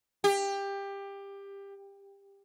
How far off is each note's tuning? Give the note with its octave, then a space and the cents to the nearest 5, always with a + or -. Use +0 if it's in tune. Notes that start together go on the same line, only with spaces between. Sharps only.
G4 +20